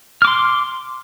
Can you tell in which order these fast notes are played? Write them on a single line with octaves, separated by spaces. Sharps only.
F6 D6 C6